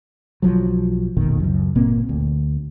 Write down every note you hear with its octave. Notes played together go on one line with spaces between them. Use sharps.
B1 F3 F#3
F1 A#1 B2 D#3
C#2 F#2
G1 A#2 A#3 C4
D2